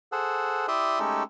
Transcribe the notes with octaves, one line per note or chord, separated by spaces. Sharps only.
G#4 A4 C5 F#5
E4 G4 D5 E5 C6 D#6
G#3 A3 C#4 D#4 G4 A4